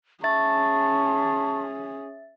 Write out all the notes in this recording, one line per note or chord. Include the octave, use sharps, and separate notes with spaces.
C#4 G#4 E5 A5 C#6 A6